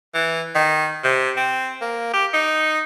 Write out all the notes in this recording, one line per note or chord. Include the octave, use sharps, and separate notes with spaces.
E3
D#3
C3
C4
A#3
G4
D#4